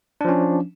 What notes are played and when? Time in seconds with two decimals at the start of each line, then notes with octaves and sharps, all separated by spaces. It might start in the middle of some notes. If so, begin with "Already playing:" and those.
0.21 D4
0.25 F3
0.29 C#4